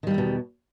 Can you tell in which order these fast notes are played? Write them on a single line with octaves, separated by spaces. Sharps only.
D#3 G3 G2 E2 B2